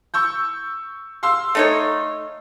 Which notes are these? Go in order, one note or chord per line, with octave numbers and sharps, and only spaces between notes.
C#6 E6 G6
F5 C6 E6
A3 D#4 C#5